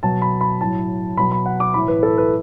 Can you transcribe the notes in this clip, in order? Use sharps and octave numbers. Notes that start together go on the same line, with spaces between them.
B2 F#3 A5
B5
B5
A2 F#3 A5
B2 F#3 B5
B5
F#5
D6
A2 E3 B5
B4
A4
B4